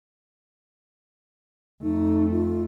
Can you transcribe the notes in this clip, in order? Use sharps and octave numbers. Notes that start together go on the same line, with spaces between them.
F2 A3 D#4
F4